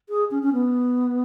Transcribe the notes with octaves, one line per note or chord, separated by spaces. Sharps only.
G#4
C#4
C#4
B3